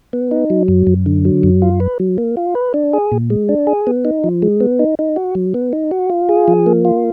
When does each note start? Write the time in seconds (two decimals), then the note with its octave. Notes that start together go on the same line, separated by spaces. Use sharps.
0.13 B3
0.31 D#4
0.50 F#3
0.68 F#2
0.87 F#2
1.06 D3
1.25 F#3
1.43 F#2
1.62 F4
1.80 B4
2.00 F#3
2.18 A#3
2.37 F4
2.55 B4
2.74 D4
2.93 G#4
3.12 A#2
3.30 G#3
3.49 D4
3.67 G#4
3.87 B3
4.05 D#4
4.24 F3
4.42 G#3
4.60 B3
4.79 D#4
4.99 D#4
5.16 F#4
5.35 F#3
5.54 B3
5.73 D#4
5.91 F#4
6.10 F4
6.29 G#4
6.48 F3
6.66 A#3
6.85 F4